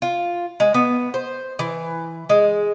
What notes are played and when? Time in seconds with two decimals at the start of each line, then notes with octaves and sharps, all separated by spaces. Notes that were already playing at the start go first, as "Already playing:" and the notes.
0.02 F4
0.60 G#3
0.74 B3
1.14 C5
1.59 E3
2.29 G#3